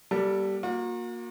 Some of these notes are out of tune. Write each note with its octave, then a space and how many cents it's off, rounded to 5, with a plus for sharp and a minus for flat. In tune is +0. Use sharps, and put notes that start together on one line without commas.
G3 -10 A#3 +45 A4 +15
A#3 +5 F#4 -45